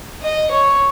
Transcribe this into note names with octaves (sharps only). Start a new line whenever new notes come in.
D#5
C#5